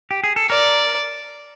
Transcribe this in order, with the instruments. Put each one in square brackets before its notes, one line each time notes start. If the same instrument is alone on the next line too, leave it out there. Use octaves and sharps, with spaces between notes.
[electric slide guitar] G4
G#4
A4
[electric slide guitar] A#4 [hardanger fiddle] D5